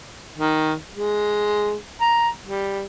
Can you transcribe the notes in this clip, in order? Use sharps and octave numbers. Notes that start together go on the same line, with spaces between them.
D#3
G#3
A#5
G3